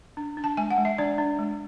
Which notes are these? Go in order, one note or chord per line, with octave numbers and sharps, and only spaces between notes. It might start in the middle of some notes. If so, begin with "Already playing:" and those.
D4
D4
A5
G#3 G#5
F#5
G#3
E5
D4 D5
D4
G#3